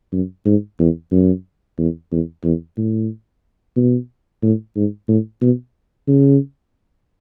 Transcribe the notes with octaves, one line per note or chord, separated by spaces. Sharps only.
F#2
G#2
E2
F#2
E2
E2
E2
A2
B2
A2
G#2
A2
B2
C#3